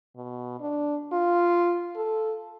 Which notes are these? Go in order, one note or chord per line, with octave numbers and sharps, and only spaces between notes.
B2
D4
F4
A4